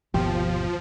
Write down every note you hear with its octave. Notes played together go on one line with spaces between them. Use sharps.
G1 D#2 B2 F3 G4